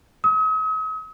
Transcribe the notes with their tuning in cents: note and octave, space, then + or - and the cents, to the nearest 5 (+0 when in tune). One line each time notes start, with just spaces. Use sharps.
D#6 +45